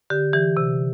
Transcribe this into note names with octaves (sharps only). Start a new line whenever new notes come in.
D3 G4
E3 G4
C3